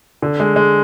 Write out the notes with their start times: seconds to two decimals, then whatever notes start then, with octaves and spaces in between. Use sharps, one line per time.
0.22 D3
0.40 G#3
0.56 G#3